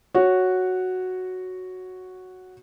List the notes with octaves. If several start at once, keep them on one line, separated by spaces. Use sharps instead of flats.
F#4 C#5